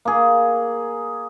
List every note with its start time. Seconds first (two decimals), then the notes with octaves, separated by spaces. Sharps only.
0.05 A#3 G#4